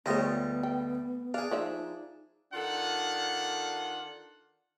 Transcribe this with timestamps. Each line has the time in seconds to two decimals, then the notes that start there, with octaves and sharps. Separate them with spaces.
0.06 D2 F3 G3 G#3 B3 C#5 D#5
0.63 G5
1.34 D4 G#4 F5
1.51 F3 D#4 D5 E5
2.54 D#3 D4 F4 A4 F#5